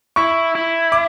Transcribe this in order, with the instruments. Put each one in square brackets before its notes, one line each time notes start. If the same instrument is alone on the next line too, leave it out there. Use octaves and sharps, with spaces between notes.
[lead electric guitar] E4 [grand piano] C#6
[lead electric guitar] E4
[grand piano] D6